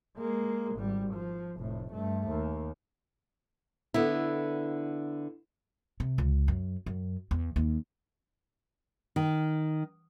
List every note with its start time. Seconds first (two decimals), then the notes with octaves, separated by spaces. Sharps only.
0.17 G#3 A#3
0.75 G#1 G3
1.14 F3
1.57 F1 A2
1.93 G2 A3
2.29 D#2
3.94 D3 B3 E4
6.00 C3
6.18 C#2
6.48 F#2
6.86 F#2
7.31 E2
7.56 D#2
9.16 D#3